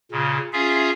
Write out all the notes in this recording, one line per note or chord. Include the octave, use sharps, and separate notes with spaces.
A#2 C#3
C#4 F4 G#4 E5 F5